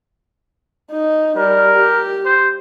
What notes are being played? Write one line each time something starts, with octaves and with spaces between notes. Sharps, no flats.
D#4
G3 A#4
G4
C5